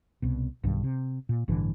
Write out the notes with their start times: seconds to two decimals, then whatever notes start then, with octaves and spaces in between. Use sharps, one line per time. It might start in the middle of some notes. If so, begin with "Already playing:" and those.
0.22 C2 B2
0.64 B1 G2 D#3
0.84 C3
1.29 A#2
1.48 A1 G2 D3 E3